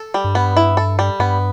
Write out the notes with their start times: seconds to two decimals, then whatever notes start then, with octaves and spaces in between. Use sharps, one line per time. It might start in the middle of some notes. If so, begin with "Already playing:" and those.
Already playing: A4
0.14 G3
0.24 G2
0.35 B3
0.57 E4
0.77 A4
0.99 G3
1.19 G2 B3